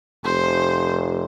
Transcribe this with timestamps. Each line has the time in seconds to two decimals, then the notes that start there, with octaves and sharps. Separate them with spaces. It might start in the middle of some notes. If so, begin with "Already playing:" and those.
0.24 F1 C5